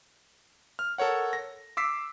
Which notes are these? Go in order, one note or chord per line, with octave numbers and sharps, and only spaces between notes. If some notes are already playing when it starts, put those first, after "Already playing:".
F6
A4 A#4 C#5 F#5
A#6
D6 E6 B6 C7